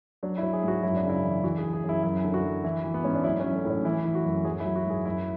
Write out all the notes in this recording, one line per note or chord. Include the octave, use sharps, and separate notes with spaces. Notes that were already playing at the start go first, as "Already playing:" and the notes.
F#3 D4
E4
F#3
G#4
G#2 F#4
F#2 E4
D4
C#3
E4
E3
E3 F#4
G#4
E3
G#4
F#2
E4
F#2 E4
D3
F#4
F#3
E3 E4
E3
B3
G#2 C#4
D4
F#3 E4
C#4
F#3
A3
A2
C#4
E3 E4
E3
F#4
F#2
F#3 G#4
E4
F#3
F#4
G#2 G#4
F#2 E4